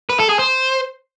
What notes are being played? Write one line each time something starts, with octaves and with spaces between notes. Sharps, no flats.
B4
A4
G#4
C5